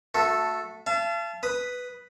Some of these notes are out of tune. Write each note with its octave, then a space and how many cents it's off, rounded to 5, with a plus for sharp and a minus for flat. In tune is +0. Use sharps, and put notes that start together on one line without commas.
A3 +5 F#4 -30 A4 +0
F5 -45 A5 -20
B4 +0 D#6 +0